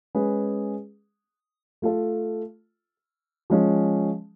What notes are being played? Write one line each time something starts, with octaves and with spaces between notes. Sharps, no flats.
G#3 C#4 G#4 B4
A3 F4 A4
F3 G#3 C#4